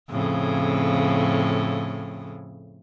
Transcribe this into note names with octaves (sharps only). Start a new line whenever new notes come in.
F2 A2 C#3